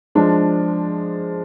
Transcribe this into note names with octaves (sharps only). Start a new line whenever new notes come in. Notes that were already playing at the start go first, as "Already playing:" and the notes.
F3 G#3 D4